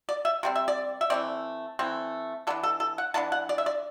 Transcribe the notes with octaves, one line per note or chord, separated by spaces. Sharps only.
D5
E5
C3 G3 C4
E5
D5
E5
E3 A3 C4 D5
E3 A3 C4
E3 B3 D4 A4
A4
A4
F#5
E3 B3 D4 A5
F#5
D5
E5
D5